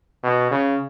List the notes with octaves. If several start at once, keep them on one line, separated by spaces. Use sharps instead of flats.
B2
C#3